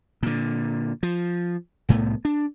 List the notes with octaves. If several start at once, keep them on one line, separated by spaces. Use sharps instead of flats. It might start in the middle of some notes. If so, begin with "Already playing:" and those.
A#2 D3
F3
C2 A2 A3 B3
D4